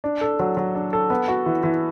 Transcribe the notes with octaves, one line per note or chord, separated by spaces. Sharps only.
D4
A4
F#3
F#3
D4
A4
B3
F#4
E3
E3